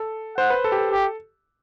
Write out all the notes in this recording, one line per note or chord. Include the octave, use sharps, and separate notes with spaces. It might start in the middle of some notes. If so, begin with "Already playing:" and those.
Already playing: A4
C5 F#5
B4
A4
G4
A4
G4